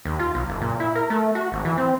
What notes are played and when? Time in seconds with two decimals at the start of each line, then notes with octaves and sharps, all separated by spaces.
0.05 D#2
0.19 F4
0.35 B1
0.48 F#1
0.61 A#2
0.80 E4
0.95 A#4
1.10 A3
1.35 F#4
1.52 G#1
1.65 E3
1.78 C4